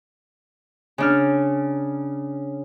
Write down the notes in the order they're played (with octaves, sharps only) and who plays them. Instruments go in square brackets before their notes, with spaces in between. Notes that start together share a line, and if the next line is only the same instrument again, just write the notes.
[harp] C#3 D4 F6